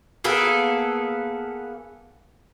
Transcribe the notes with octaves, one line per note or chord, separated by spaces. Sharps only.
A#3 B3 G#4 A4